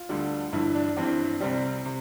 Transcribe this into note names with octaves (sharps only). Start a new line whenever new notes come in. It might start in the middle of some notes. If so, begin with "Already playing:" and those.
Already playing: F4
D2 D3 G3
G1 G2 E3 E4
D4
G1 G2 E3 C4
C2 C3 G3 C4
C3